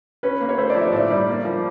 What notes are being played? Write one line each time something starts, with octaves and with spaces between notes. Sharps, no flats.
C#4 B4
A#3
C#5
A3 C5
D5
F3
E5
A2 D5
G3
A#3
F3